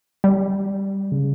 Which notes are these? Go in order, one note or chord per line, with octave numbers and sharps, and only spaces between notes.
G3
C#3